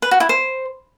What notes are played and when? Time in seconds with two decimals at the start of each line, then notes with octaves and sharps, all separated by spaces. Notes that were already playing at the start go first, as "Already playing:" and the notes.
0.02 B4
0.11 F#4
0.20 E4
0.29 C5